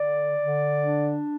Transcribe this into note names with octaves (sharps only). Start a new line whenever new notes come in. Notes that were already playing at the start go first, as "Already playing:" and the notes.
Already playing: D3 D5
D3
D4